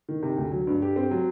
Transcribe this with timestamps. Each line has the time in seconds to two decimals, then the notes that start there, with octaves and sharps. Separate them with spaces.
0.09 D#3
0.23 C3
0.37 D2
0.52 F#3
0.67 G2
0.82 G4
0.96 C4
1.11 F#3